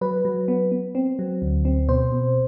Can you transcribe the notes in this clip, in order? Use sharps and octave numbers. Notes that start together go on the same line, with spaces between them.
F#3 B4
F#3
B3
B3
C4
F#3
D2
C4
B2 C5
B2